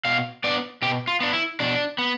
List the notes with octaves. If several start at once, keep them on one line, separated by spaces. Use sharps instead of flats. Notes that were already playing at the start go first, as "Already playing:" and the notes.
B2 F5
B3 D4 D5
B2 G4
F4
B3 D4
E4
B2 D4
B3